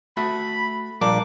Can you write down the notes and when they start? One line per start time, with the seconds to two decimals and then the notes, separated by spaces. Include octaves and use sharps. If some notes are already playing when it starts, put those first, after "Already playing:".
0.17 A3 F#4 E5 B5
1.01 A#1 G3 A#3 D4 D6